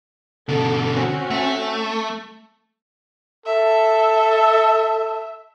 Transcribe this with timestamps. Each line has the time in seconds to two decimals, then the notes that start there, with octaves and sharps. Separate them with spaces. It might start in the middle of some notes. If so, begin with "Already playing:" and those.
0.49 B2 D3 A4
0.93 C4 C#4 F#4
1.30 A3
3.46 A4 E5